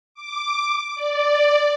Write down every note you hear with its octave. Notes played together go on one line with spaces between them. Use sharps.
D6
D5